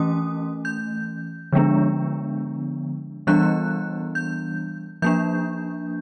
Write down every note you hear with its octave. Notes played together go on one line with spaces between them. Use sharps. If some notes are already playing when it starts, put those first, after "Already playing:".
Already playing: E3 A3 C#4 D#6
G6
D3 F3 G#3 B3 D4
E3 G3 B3 D4 F#6
G6
F3 A#3 D4 G6